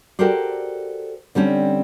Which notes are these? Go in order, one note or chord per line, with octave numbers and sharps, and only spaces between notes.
F#4 G4 A4 A#4 C5 D5
D3 G3 C4 C#4